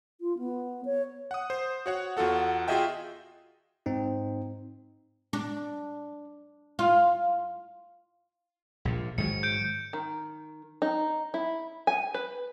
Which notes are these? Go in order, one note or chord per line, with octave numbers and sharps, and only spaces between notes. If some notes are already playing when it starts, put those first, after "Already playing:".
F4
B3
C#5
F#5 D#6
C5
F#4 C#5 F#5
E2 F4 F#4 A4 F#5
F4 F#4 G#4 D#5 E5 G5
G#2 C4 D#4
D4
F4
A#1 A#2
G#2 D#3 F#3 C#7
G6 D7
D#3
D#4
E4
G#5
B4